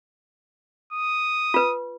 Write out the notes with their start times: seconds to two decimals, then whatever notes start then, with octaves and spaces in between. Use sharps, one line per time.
0.93 D#6
1.54 F4 B4